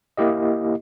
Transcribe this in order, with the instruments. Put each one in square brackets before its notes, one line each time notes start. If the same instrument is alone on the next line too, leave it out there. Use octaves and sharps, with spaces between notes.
[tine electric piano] A#3 E4 G4 D#5